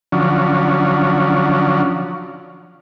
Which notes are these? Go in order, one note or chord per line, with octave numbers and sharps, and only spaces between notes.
D3 F3 F#3 C#4